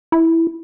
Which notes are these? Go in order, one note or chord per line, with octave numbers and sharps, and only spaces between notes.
E4